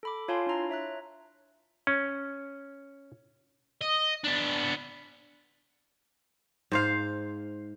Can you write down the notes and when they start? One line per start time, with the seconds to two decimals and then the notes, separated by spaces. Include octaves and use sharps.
0.03 A4 B5 D6
0.28 F4 C#5 F5 G#5 A5 C6
0.47 D4 E4 A#5
0.70 C#5 E5 A#5 F#6
1.87 C#4
3.81 D#5
4.24 B3 D4
6.71 G#2 C5 F5